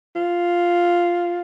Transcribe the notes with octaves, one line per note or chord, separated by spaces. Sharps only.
F4